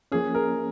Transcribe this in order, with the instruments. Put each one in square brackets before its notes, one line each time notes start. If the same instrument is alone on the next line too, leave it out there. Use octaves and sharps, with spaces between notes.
[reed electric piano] F3 A#3 C#4 [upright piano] G#4
[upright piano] A#4